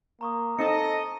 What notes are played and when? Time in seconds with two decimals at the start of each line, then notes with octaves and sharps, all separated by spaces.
0.21 A#3 A#5 C#6 D#6
0.59 C4 D#4 A4 D#5 A5 C#7